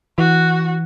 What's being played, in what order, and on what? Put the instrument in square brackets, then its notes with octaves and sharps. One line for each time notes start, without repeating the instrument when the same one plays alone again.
[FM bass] E3 [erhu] F#4